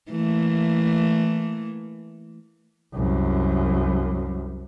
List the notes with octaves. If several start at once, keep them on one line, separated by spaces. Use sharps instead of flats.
E3 A3 A#3
C2 F#2